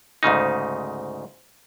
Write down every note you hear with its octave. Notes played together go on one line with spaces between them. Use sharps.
D2 G#2 C#3 D#4